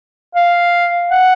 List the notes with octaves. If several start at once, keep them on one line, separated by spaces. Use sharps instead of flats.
F5
F#5